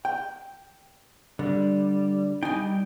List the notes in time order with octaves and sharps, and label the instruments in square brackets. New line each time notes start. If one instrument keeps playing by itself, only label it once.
[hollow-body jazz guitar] G5
[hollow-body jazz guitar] D3 [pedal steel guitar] G3
[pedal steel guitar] G3 G5 [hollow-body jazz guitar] D#4 G#5